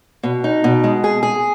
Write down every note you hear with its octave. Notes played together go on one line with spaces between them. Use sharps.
B2
D#4
B2
G#3
G#4
G#4